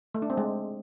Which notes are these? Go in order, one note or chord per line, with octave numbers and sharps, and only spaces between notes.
A3
D4
C4
G#3